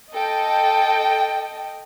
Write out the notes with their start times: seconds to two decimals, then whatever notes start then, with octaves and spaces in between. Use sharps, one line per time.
0.14 A4 D#5 G5